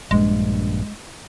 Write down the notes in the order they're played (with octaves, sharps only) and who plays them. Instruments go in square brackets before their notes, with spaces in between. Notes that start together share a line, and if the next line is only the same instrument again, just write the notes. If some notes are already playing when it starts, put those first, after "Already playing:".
[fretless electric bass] A#1 G2 [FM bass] G#3